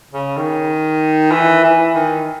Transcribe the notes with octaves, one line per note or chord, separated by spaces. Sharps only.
C#3
D#3
E3
E3
D#3